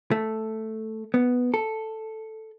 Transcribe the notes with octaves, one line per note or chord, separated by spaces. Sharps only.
A3
B3
A4